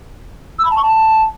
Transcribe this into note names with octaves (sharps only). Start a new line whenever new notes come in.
E6
B5
A5
C#6
A5